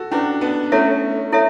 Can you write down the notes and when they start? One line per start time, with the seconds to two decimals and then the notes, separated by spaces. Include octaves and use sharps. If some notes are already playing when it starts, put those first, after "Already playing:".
Already playing: F#4 A4
0.11 C#4 D4 E4 F#4 B4
0.41 B3 D4
0.72 A3 C#4 E4 A4 C#5 E5
1.32 E4 A4 C#5 E5